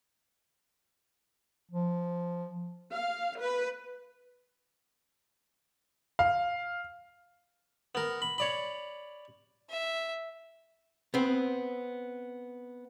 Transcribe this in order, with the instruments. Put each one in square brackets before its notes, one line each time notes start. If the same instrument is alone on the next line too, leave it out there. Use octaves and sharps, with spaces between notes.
[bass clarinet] F3
[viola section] F5
B4
[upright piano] F5
[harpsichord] B3 A#4
B5
C#5 D5 B5
[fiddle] E5
[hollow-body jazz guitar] B3 C4